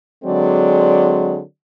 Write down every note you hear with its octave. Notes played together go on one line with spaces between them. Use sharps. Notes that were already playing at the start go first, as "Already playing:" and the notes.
D3 F#3 G#3 C4 G#4 D5